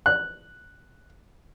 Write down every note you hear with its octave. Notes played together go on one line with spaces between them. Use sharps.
F#6